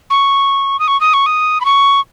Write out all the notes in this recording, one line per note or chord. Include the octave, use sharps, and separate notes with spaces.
C#6
D#6
C#6
D#6
C#6
D#6
B5
C#6